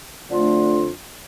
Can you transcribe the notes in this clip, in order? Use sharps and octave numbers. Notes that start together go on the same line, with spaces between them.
F2 D3 A3 D4 F4